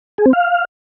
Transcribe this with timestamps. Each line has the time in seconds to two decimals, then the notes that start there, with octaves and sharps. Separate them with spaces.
0.18 G#4
0.26 C4
0.33 F5